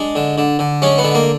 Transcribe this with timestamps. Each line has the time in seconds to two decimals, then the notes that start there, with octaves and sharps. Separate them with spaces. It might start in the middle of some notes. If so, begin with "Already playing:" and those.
Already playing: G#3 D4
0.15 D3
0.38 D3
0.59 D3
0.82 G#3 C#4
0.98 B3
1.04 D3
1.15 A#3